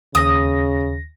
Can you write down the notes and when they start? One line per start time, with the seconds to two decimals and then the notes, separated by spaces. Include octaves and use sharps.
0.15 D#2 C#3 D#6 A#6